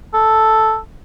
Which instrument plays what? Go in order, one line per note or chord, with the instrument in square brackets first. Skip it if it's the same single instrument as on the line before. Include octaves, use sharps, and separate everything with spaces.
[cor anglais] A4